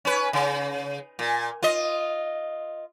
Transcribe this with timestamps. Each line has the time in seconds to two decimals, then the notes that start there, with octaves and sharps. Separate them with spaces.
0.05 C#4 B4
0.33 C#3
1.19 A#2
1.63 F4 D#5